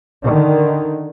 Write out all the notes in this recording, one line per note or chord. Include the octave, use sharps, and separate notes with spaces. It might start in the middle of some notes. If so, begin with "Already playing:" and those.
D3 D#3